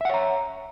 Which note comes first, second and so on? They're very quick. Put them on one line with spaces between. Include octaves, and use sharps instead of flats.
E5 F#5 C#5 A#5